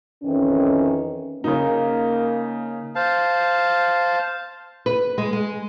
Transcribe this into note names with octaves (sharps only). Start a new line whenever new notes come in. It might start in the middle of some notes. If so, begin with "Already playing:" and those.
F2 D#3 E3 C#4
C#3 A#3 D#4
C5 F5 A5
B4
G#3
G#3